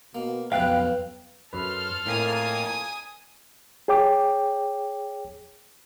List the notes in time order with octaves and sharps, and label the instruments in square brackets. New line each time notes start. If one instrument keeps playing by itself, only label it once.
[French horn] B2 [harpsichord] A#3
[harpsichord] B1 F2 C#3 [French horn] B4 [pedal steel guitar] F5 G5 F#6
[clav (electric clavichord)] F#2 B4 [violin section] A4 C6 F6
[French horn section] F2 A#3 [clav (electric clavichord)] A2 [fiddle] G#5 D#6
[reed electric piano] G#4 C#5 G5 D6